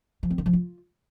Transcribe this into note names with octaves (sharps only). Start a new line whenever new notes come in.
F3
C4
D#3
F3
F4